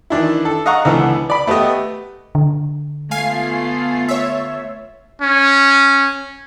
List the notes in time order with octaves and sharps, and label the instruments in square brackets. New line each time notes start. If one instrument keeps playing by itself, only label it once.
[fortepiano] D#3 E3 D4 E4
A4
D#5 F5 F#5 A#5 C#6
C#2 D3 E3 B3
D5 B5
A3 B3 G4 D#5
[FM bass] D3
[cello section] A3 B3 F4 [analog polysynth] F5 G#5 C7
[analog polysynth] C#5 E5
[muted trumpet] C#4